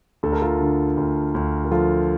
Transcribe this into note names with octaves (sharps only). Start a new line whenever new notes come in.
D2 A4
A#4
F4 A4
D3
D2
D2
A#4
F3 F4 A4